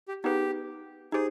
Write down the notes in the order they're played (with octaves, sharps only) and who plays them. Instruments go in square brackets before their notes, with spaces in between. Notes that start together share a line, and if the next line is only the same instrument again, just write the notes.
[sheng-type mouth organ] G4
[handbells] B3 D#4 G#4 B4 [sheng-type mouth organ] G4
[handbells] D#4 G4 C5 [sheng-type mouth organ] G#4